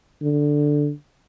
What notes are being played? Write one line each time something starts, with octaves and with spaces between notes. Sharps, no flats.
D3